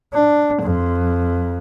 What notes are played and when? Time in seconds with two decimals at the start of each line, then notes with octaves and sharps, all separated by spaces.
0.13 D4
0.61 F2